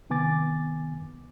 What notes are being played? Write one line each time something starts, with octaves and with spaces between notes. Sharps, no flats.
C3 D#3 B3 G#5 D6 A6